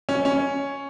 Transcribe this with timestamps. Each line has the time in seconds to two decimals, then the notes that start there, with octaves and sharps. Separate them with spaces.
0.09 C#4
0.25 C#4